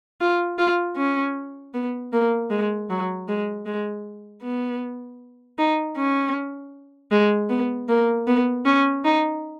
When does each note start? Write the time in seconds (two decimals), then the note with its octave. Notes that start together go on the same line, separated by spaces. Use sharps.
0.21 F4
0.58 F4
0.97 C#4
1.74 B3
2.13 A#3
2.50 G#3
2.90 F#3
3.28 G#3
3.66 G#3
4.43 B3
5.58 D#4
5.97 C#4
7.11 G#3
7.50 B3
7.89 A#3
8.27 B3
8.65 C#4
9.04 D#4